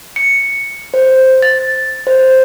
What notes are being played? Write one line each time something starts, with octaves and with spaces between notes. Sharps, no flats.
C#7
C5
A6
C5